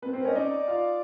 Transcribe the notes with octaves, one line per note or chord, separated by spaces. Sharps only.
B3 C4 B4
C4 C5
A#4
C#4 C#5 D#5
D#4 D5 D#5
F4 F5